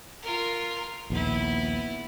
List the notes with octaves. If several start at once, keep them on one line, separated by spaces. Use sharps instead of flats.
F4 A#4
A#1 D#2 B3 E4